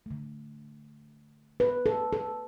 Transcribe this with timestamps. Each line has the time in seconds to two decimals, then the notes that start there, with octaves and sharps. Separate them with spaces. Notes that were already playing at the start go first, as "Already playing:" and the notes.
0.06 D3 A3
1.60 B4
1.86 A4
2.13 A4